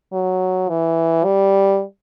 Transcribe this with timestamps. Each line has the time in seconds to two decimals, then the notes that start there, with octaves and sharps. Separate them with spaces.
0.13 F#3
0.69 E3
1.24 G3